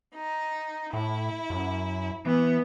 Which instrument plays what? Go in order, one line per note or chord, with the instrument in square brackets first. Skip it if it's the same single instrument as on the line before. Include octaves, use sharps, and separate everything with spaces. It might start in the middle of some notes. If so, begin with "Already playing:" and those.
[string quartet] D#4
[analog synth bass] A2 [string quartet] E4
[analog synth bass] F#2
[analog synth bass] E3 [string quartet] B3